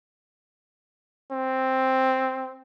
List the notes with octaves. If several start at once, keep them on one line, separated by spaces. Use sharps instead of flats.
C4